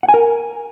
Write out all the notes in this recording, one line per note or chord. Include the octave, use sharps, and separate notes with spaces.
F#5
G#5
A#4